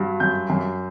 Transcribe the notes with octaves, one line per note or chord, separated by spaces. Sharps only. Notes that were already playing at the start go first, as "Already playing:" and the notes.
Already playing: G2 F#3
F#2 G6
F#2